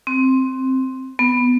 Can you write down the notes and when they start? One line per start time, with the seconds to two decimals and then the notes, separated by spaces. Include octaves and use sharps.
0.07 C4
1.19 B3